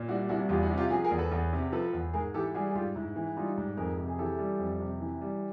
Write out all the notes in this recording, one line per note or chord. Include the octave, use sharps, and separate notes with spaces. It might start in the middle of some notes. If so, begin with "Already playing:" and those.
Already playing: A#2
G3 E4 F#4
C2 E4 F#4
E2 F4 G4
E4 F#4
C3
F4 G4
F3 F#4 G#4
G#4 A#4
E2
A4 B4
E2
C3
F3 A4 B4
E2
G#2 G#4 A#4
E3 G4 A4
G3 F#4 G#4
G#4
G#2 F4 G4
G#2 E4
E3
G3 D#4 F4
G#2
F2 G#4 A#4
C3
G#4
E3 G4 A4
G3
F2
C3
E3
G3